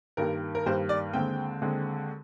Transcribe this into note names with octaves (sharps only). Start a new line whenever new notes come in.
G2 D#3 G3 A#3 A#4
A#4
G2 D#3 G3 A#3 C5
D5
D#2 D3 G#3 C4 G5
D#2 D3 G#3 C4